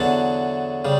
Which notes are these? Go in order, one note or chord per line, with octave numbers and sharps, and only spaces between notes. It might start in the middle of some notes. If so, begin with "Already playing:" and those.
Already playing: E2 D3 F#3 F#5 A5
C#3 G3